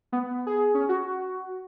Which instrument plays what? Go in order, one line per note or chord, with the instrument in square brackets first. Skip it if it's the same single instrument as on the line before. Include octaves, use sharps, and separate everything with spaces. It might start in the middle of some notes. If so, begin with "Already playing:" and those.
[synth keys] B3
G#4
C#4
F#4